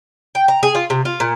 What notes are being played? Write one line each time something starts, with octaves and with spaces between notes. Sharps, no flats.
G5
A#5
G#4
F4
C3
F4
A#2